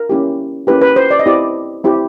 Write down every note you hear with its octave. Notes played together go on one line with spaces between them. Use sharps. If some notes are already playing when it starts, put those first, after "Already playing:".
Already playing: A#4
A#3 C#4 E4 G4
A#3 C#4 E4 G4 B4
B4
C5
D5
D#5
C4 E4 G4 D5
C4 E4 G4